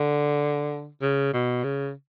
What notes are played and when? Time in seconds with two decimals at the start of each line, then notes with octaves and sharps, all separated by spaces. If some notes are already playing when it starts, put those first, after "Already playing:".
Already playing: D3
1.02 C#3
1.33 B2
1.64 C#3